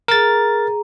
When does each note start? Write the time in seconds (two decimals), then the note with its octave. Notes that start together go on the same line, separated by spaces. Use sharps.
0.08 G#4 A#4 A#5 A6